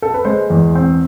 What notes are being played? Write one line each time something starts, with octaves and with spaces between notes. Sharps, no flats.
A4
B4
G#3 C5
E2
C4